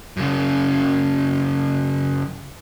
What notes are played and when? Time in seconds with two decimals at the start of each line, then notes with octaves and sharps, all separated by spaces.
0.17 F#2 C#3